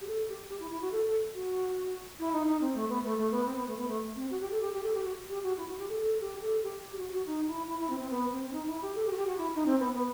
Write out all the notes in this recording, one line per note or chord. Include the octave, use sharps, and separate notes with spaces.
G4
A4
G4
G4
E4
E4
F#4
A4
A4
F#4
E4
D#4
D#4
C4
A3
B3
A3
A3
B3
C4
B3
A3
B3
A3
C4
F#4
G4
A4
G4
G4
A4
G4
F#4
G4
F#4
E4
F#4
G4
A4
A4
G4
A4
G4
G4
F#4
F#4
D#4
E4
E4
E4
C4
C4
B3
C4
C4
D#4
E4
G4
A4
G4
F#4
G4
F#4
E4
D#4
C4
B3
B3